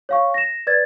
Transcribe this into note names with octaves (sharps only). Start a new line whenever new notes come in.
C#5 F5 C#6
A#6 E7
B4 D5 G#6 A6